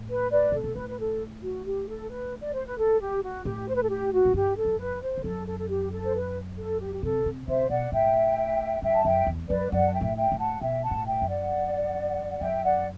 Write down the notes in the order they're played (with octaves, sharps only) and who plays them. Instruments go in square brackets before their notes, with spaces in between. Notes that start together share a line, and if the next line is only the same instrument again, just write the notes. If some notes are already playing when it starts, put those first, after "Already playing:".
Already playing: [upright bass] A2
[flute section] B4
B4 D5
[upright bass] C3 [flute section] A4
[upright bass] B2
[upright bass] A2 [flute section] B4
[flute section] B4
A4
F#4
G4
A4
B4
D5
C5
B4
A4
G4
F#4
[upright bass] A2 [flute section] G4
[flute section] C5
B4
A4
G4
F#4
[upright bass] A2
[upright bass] G2 [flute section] G4
[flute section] A4
[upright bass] F#2
[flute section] B4
C5
[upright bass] E2
[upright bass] F#2 [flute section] A4
[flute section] A4
A4
G4
A4
C5
B4
A4
G4
G4
[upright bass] C3 [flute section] A4
[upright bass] C3
[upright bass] C3 [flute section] C5 E5
[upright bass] B2 [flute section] D5 F#5
[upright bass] A2 [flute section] E5 G5
[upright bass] G2 [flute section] E5 G5
[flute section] A5
[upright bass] F#2 [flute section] E5 G5
[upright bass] E2
[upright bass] F#2 [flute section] B4 D5
[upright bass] F#2 [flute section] D5 F#5
[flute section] A5
E5 G5
[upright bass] A2
[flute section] E5 G5
[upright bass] A2
[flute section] F#5 A5
[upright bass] B2 [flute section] E5 G5
[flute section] F#5 A5
[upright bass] A2
[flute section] F#5
E5 G5
[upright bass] F#2
[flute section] D5 F#5
[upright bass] F#2 [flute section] E5 G5
[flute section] D5 F#5